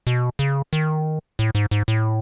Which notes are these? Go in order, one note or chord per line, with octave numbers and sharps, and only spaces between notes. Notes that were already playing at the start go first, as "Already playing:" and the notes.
B2
C#3
D#3
A2
G#2
G#2
A2